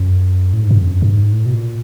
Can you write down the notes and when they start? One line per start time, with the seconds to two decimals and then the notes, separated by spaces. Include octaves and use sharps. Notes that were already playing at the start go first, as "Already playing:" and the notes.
Already playing: F#2
0.53 A2
0.63 G#2
0.71 G2
0.82 F2
0.91 F#2
1.02 G2
1.12 G#2
1.33 A2
1.46 B2
1.53 A#2